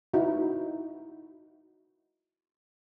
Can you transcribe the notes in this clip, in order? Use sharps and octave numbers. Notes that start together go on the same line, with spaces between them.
D#4 E4 F#4